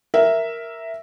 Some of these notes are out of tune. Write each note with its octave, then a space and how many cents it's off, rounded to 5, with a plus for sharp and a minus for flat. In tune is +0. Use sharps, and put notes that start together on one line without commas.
A#4 +0 E5 +0